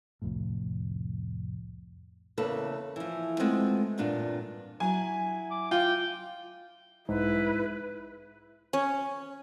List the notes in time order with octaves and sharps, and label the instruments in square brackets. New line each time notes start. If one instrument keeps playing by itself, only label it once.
[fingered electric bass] C2 F2 A2
[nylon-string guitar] E2 C#3 A#3 A4 B4
E3 F3
G#3 A3 B3 C4 F4 A4
E2 G2 A#2 D4 F4
[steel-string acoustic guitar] F#3 E4 [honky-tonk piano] G#5
[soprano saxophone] D6
[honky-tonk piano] F4 [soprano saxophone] G5
[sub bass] B1 [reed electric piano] G#2 [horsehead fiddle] E4 B4
[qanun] C#4